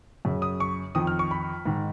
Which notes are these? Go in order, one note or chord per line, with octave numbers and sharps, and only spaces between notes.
F#2 C#3
D#6
C#6
F2 D#3 D#6
F6
C#6
B5
G#2 D#3